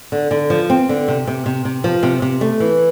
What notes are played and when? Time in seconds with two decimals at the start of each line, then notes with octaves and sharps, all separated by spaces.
0.12 D3
0.31 D3
0.50 F3
0.70 C4
0.89 D3
1.08 C3
1.27 C3
1.46 C3
1.65 C3
1.84 F3
2.03 C3
2.22 C3
2.41 A3
2.60 E3